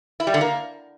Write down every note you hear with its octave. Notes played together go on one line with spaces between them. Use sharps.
E4
G3
D3
A#3